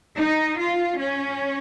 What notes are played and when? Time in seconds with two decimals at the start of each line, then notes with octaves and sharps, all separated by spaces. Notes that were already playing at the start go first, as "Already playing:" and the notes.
0.17 D#4
0.58 F4
0.98 C#4